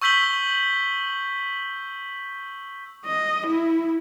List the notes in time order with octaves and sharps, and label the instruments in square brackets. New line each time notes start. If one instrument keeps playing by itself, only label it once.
[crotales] C#6 E6 G6 B6 F#7 G7
[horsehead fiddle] D#5
E4